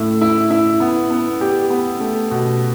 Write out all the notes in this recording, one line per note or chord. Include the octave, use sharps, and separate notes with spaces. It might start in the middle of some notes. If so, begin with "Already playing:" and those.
Already playing: A2 E4
E4
E4
B3
B3
G4
B3
A3
B2